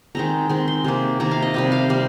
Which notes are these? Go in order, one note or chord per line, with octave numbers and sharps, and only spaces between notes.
D#3 G#3 C4 A#5
D#3 G#3 C4 C6
C6
C3 D#3 A#3
C3 D#3 A#3 A#5
F5
D#5
C3 G3 C4 F5
F5
C3 G3 C4